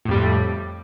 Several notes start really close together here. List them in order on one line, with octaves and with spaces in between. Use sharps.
A2 F2 G3